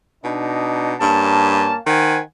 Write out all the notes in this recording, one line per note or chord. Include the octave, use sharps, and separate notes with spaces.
B2 D4 D#4
G2 A#3 C#4 A5
D#3 C5 F#5 G#5